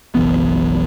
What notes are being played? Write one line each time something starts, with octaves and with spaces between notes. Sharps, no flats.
F#1 B1 E3 B3